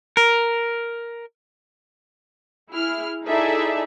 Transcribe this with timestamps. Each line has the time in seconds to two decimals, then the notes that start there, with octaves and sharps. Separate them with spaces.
0.17 A#4
2.71 E4 G#4 F6
3.25 D#4 E4 G#4 A4 D5 E5